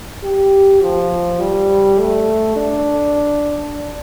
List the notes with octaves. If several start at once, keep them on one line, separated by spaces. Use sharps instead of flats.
G4
F3
G3
A3
D4